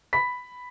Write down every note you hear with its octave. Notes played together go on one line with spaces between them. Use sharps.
B5 B6